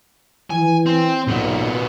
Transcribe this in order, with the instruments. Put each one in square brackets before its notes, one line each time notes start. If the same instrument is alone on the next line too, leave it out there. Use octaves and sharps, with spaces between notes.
[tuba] E3 [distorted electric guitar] G#5
[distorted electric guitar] C4
[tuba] B1 [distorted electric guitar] A#2 B3